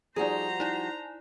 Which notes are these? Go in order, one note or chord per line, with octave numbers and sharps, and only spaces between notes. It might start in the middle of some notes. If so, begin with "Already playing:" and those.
F3 G3 D#4 F#4 G#4 C5 A#5
D#4 E4 D5